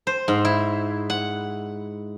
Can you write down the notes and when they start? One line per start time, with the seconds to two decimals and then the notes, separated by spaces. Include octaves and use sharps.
0.07 C5
0.28 G#2
0.45 E4
1.10 F#5